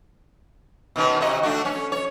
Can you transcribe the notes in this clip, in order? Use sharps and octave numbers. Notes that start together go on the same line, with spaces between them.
B2 D#3 C#4
C3 F#4 D#5
A3 D4 F#4
C#4
C#5